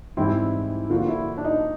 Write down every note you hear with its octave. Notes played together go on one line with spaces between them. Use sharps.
G#2 E3 G3 C4 E4
D3 F3 A#3 D4 F4 F#4
E4
D4
D#4